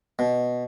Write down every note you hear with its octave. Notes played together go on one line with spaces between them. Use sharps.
B2